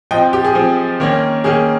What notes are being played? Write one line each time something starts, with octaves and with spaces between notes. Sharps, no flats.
F3 C4 D#5 G5
G4
G#4
F3 C4
D#3 A#3 C#4
D#3 A#3 C#4 G#4